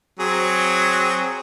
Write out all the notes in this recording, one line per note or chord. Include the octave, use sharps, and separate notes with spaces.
F#3 C4 G#4